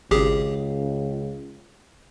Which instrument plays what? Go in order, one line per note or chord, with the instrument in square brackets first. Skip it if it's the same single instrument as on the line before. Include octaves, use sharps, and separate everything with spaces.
[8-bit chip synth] G#1 G4 G#4 [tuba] C#2